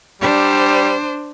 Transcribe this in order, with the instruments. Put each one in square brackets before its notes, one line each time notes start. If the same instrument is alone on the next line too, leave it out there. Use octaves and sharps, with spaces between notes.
[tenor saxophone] G3 [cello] D4 C5